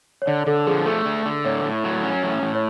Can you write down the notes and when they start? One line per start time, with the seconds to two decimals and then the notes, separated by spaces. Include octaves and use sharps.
0.22 C#5
0.27 D3 D5
0.46 D3 A4
0.67 F3 G#4
0.86 A3 A4
1.06 D3
1.26 D3
1.45 A2 C#5
1.64 A2
1.84 F#3
2.04 C#4
2.23 A2
2.42 A2
2.55 C#5